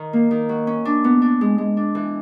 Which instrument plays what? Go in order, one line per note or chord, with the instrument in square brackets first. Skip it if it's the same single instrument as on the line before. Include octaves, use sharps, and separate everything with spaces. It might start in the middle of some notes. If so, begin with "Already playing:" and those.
Already playing: [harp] D#3
A#3
D#3
F#3
C#4
D4
B3
D4
G#3
G#3
D4
E3